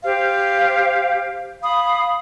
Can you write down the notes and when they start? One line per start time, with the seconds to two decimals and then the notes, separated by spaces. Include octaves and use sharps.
0.03 G4 C5 F5
1.62 F5 B5 D#6